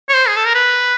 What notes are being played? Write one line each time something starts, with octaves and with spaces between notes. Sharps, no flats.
C#5
C5
G#4
A4
A#4
B4